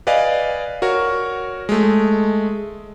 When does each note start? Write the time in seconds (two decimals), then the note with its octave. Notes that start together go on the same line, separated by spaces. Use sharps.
0.07 B4 D5 D#5 F5 G#5
0.82 F#4 A#4 C#5
1.69 G#3 A3